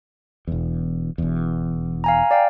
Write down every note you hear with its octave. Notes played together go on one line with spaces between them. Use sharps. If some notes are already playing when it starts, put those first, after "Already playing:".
E1 E2
E1 E2
F5 G#5 A#5
D5 F5 G5